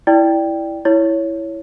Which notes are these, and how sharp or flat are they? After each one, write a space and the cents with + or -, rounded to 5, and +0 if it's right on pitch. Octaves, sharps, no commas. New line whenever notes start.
E4 +0 D5 +0 G5 +0
E4 +0 C#5 +5